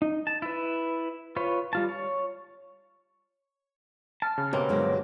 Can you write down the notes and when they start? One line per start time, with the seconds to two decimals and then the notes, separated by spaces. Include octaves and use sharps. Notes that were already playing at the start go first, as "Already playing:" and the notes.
0.02 D#4
0.27 A5
0.42 E4 B4
1.36 F4 B4 C#5
1.73 G3 F4 A5
1.89 C#5
4.22 A5 F6
4.38 C#3
4.53 B2 A#3 C4 G4 C#5
4.69 G1 G2 F#3 G#3 A#4